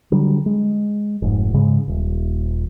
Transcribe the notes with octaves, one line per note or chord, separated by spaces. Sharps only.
D3 F#3 G3
G#3
F1 G#2
G#2 C#3 G#3
D#1